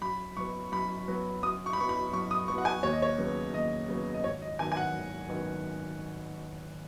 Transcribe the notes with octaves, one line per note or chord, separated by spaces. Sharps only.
F#2 B5
F#3 B3 C#6
F#2 B5
F#3 B3
F#2 D#6
C#6
B5
F#3 B3 C#6
B5
F#2 C#6
D#6
F#3 B3 C#6
F#5
G#5
D#2 C#5
D#5
C#5
C#3 F#3 B3
D#2 D#5
C#3 F#3 B3
D#5
G#1 C#5
D#5
F#2 D#3 B3 G#5
G#5
F#5
G#1
F#2 D#3 B3